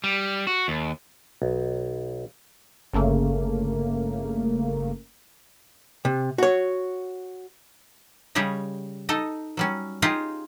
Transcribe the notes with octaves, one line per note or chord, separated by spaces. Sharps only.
G3
F#4
D#2
B1
G1 C#3 A3 A#3
C3
F#4 C#5
C#3 G3 G4 C#5 D#5
D#4 A4 D#5
F#3 G3 C#4
D#4 F4 G4 G#4 D#5